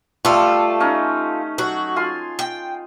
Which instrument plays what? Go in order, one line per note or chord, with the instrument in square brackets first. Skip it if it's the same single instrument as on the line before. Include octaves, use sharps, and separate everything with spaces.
[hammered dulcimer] G3 A3 [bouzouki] F4 A4
[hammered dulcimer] C#4 D#4
[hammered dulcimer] F#3 [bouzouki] F#4
[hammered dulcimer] F4 G#5 C6
[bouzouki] G5